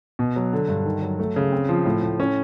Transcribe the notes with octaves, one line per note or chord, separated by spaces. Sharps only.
B2
F#3
D3
G2
D#3
F#3
A3
C#3
C4
F3
A2
A2
C#4